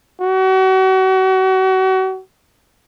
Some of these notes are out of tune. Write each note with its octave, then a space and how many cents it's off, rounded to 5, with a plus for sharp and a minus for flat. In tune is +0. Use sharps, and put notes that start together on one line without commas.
F#4 +35